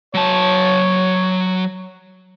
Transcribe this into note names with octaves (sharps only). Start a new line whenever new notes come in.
F#3 C#5 A5